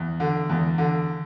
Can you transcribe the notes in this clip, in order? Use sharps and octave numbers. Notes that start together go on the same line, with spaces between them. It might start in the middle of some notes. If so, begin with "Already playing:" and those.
Already playing: E2
D3
E2
D3